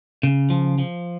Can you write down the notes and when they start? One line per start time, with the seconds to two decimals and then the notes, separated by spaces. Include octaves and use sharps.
0.23 C#3
0.50 F3
0.78 F3